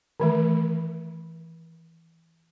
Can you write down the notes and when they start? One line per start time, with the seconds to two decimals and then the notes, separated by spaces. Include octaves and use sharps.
0.20 D#3 E3 A3